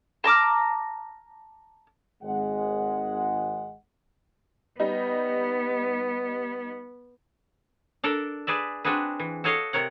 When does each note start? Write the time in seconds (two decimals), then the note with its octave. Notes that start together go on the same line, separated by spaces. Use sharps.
0.24 A5 A#5 D6 F6
2.23 G#1 G#3 F#5
4.80 G3 B3 D#4
8.04 D4 A4 A#4 D5
8.47 G#4 B4 D5 E5
8.84 C4 D4 F#4 G#4 B4
9.20 E3
9.44 F#4 A4 C#5 D#5 F5
9.73 C3 A#4 C#5 F#5